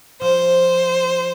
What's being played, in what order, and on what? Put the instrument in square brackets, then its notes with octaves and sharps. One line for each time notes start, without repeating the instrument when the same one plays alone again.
[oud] F3 [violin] C5